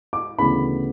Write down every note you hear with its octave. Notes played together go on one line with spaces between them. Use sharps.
D6
D2 C#3 E3 B3 B5